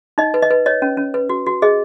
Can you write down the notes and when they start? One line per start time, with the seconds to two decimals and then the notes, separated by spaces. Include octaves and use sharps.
0.18 D#4 D#5
0.34 B4
0.42 D#5
0.51 B4
0.66 C#5 D#5
0.82 C#4
0.97 C#4
1.14 B4
1.29 F#4
1.46 F#4
1.62 G#4 D#5